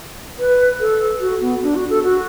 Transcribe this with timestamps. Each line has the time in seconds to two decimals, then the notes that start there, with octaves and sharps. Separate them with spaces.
0.39 B4
0.80 A4
1.20 F#4
1.41 B3
1.63 D4
1.75 F#4
1.90 A4
2.04 F#4